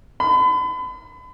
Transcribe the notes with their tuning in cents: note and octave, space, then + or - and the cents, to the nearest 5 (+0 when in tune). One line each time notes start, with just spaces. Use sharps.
B5 +40